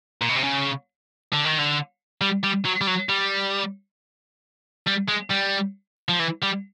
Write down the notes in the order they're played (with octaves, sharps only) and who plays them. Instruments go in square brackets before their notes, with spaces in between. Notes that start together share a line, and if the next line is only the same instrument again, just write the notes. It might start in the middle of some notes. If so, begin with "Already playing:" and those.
[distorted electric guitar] A#2
B2
C3
C#3
D3
D#3
D3
G3
G3
F#3
G3
F#3
G3
G3
G#3
G3
F3
E3
G3